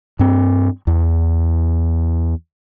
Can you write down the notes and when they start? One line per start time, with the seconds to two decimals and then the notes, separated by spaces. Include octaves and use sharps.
0.19 G2 C4
0.87 E2